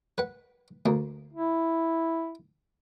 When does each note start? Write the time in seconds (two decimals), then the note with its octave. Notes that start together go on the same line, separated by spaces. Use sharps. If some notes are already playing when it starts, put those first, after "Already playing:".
0.18 B4 F#5
0.86 D2 A#3
1.33 E4